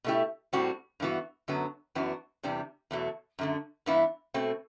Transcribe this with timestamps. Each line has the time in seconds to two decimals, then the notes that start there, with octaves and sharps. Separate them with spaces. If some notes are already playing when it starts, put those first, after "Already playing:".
0.04 B2 A3 E4 G4
0.53 A2 G3 C4 F#4
1.00 G2 E3 B3 F#4
1.48 F#2 D3 F#3 B3
1.95 F#2 E3 B3 D4 F#4
2.43 E2 C3 E3 G3 D4
2.91 E2 B2 F#3 A3
3.39 F#2 D3 A3
3.86 G2 E3 B3 E4
4.34 B2 A3 C4